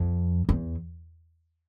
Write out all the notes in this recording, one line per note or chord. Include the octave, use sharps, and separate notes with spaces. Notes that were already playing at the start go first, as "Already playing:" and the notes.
Already playing: F2
E2